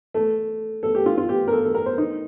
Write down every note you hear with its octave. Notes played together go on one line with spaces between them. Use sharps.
A3
A4
G4
F4
F4
G4
A#4
A4
A4
A#4
C5
D#4